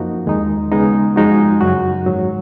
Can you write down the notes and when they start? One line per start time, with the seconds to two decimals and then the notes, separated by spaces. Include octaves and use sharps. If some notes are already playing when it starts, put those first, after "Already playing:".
Already playing: F#2 F3 A#3 D#4 F#4
0.26 D#2 D#3 G#3 D#4
0.72 C#3 G#3 B3 D#4
1.16 F#2 F3 G#3 D#4 F#4
1.61 F#2 C#3 F#3 C#4 F#4
2.07 G#2 D#3 F#3